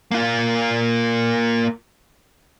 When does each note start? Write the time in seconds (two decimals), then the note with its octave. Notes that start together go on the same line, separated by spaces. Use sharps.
0.11 A#3 F4